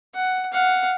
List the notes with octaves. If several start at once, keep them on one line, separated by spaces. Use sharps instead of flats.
F#5
F5 F#5